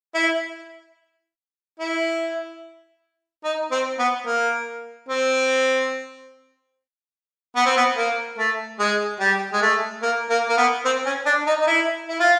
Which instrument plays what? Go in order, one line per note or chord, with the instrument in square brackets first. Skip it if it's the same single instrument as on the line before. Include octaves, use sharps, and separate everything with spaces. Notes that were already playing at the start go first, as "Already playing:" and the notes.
[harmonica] E4
E4
D#4
C4
B3
A#3
C4
B3
C4
B3
A#3
A3
G#3
G3
G#3
A3
A#3
A#3
A#3
B3
C4
C#4
D4
D#4
D#4
E4
E4
F4